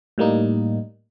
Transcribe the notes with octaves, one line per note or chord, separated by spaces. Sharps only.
A2 G3 A#3 D#4